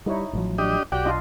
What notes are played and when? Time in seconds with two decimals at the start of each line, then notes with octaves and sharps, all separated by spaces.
0.06 G3 D#4 E4 C#5
0.33 A1 F3 F#3
0.58 D4 G4 D#5
0.92 B1 F#4 G4 D5 G5
1.05 D4 F4 D#5